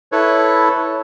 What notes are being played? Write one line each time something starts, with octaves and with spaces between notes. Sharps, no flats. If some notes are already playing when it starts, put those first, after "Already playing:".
E4 A4 B4 C#5